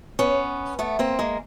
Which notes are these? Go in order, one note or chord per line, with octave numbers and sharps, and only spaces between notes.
B3 C#4
A3 B3
A#3 C4
G#3 A#3